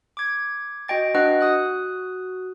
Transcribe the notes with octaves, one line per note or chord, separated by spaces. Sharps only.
D6 G#6
F#4 D#5 G5 A6
D4 F#4 B4 D#5 F#5 F#6
F#4 D#6 F#6